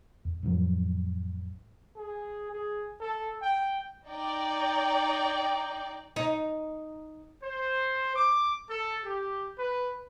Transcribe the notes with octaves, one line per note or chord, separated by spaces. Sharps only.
E2
A1 F2 F3 F#3
G#4
G#4
A4
G5
D#4 D5 G5
D#4
C5
D6
A4
G4
B4